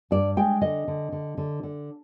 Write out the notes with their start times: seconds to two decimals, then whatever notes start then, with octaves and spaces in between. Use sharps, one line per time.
0.11 G2 D5
0.37 G#3 G5
0.61 D3 D#5
0.88 D3
1.12 D3
1.38 D3
1.63 D3